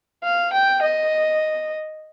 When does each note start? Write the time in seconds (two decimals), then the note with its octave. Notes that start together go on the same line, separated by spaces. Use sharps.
0.24 F5
0.53 G5
0.82 D#5